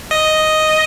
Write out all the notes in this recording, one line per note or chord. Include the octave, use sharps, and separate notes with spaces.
D#5